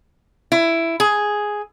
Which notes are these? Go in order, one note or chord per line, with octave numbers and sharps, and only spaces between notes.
E4
G#4